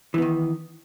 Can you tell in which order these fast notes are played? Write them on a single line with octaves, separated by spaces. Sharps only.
E3 B3 D#3